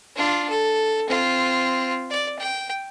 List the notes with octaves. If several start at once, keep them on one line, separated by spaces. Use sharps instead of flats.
D4 F4
A4
C4 F4
D5
G5